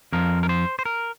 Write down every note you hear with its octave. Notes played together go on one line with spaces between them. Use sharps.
F2 F3 A#4
A#4
C5
C5
A#4